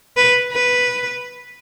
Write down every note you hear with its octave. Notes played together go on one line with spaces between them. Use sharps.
B4
B4